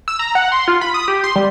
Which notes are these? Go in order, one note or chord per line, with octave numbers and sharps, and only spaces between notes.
E6
A#5
F#5
C6
F4
B5
D#6
G4
C6
G3